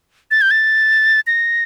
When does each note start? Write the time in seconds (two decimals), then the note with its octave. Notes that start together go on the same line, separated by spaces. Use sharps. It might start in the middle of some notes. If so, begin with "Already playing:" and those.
0.31 A6
0.41 G6
0.51 A6
1.27 A#6